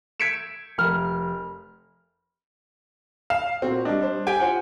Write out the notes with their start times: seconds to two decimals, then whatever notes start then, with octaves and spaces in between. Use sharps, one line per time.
0.20 G#6 B6 C#7 D7 E7
0.78 F1 A#4 F6
3.30 F5 E7
3.62 A#2 C4 F#4
3.85 G3 D4 D#5
4.02 C5
4.27 G4 G5 G#5
4.39 F4 C5 F#5